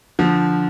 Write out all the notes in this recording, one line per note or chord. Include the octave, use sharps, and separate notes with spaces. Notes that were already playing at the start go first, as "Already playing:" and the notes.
D3 F3